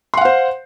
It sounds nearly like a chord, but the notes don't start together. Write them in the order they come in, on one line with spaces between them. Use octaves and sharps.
C6 F#5 F5 C5